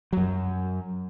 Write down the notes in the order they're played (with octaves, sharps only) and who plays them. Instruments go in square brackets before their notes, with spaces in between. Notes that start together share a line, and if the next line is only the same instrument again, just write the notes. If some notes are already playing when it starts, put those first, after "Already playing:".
[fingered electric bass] F#2 F#3